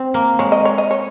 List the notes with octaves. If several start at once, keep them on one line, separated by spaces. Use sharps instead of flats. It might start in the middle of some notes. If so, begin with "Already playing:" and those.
Already playing: C4
A#3
G#3 C#5
D#5
C#5
D#5
C#5